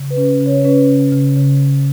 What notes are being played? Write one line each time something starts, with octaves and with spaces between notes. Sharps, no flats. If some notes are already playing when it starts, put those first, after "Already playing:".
Already playing: C#3
B4
C#4
C#3
C#5
C#4 B4
C#3
C#3
C#3